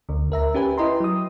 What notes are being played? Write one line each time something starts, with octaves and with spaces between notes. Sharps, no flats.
D2 D3
D2 A#4 E5 A#5
C#4 G4 B4 G#5
E4 B4 D#5 G5 A#5 C6
F#3 D#6